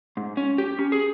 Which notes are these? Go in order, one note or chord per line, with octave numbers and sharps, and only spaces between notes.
G#2
C#4
G4
C#4
G#4